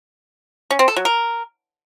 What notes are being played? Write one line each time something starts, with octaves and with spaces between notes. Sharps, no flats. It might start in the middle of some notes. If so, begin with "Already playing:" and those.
C#4
C4
A4
F#3
A#4